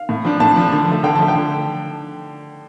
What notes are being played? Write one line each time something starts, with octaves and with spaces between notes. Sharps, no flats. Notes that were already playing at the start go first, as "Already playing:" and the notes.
Already playing: F5
A2
F3 D4
A2 A5
F3 D4
D3
F3 A3
D3 G5
F3 A3 A5
G5
D3